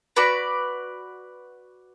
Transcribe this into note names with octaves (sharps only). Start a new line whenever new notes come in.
F#4 B4 D5